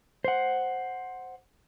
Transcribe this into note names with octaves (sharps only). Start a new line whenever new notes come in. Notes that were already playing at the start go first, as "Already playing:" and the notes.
C5 F#5